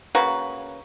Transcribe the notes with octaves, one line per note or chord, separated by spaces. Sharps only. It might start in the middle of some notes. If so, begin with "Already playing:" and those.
C#3 A#3 F#4 B4